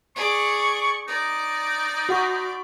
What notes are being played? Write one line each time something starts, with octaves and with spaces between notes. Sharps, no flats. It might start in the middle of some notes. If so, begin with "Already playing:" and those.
G#4 D5 C#6
D#4 D5
F#4 F#5 C#6